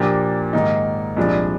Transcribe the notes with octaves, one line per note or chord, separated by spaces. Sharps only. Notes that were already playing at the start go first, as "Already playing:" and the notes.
Already playing: A#2 F3 A#3 D4 G4
G#2 D#3 A#3 D#4
C2 A#2 F3 G#3 D4